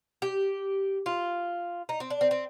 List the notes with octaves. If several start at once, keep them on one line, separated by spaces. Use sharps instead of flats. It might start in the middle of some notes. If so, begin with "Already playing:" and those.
G4
F4
D#4
C4
D4
C4
C4